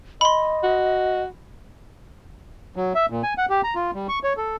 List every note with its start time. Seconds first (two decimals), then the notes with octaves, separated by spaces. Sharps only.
0.21 D#5 B5 C6
0.63 F#4
2.76 F#3
2.95 E5
3.10 A#2
3.23 G#5
3.38 F#5
3.50 G4
3.64 A#5
3.75 F4
3.94 G3
4.08 C#6
4.24 C#5
4.37 A4